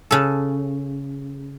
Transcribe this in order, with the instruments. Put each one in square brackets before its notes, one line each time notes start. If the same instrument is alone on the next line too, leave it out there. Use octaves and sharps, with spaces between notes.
[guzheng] C#3 A4